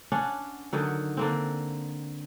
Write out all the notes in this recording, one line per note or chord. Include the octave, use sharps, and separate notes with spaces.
C#4 D4 F#5
D3 D#3 F#3
D3 A#3 C4